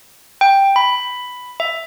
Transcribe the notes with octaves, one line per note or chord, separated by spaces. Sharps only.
G5
B5
E5